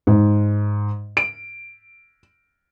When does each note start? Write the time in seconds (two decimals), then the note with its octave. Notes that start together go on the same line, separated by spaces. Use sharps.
0.07 G#2
1.17 D7